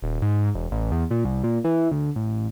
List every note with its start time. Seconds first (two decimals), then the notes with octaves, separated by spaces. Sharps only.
0.02 D#1
0.22 G#2
0.55 E1
0.71 A1
0.92 E2
1.11 A#2
1.25 C2
1.44 A#2
1.64 E3
1.92 D2
2.16 A1